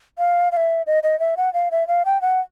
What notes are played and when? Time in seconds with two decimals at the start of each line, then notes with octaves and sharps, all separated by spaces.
0.18 F5
0.52 F5
0.57 E5
0.87 D#5
1.03 D#5
1.20 E5
1.37 F#5
1.54 F5
1.71 E5
1.88 F5
2.05 G5
2.21 F#5